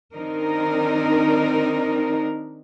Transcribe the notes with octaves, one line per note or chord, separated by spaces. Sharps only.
D#3 C4 D4 D#4 A#4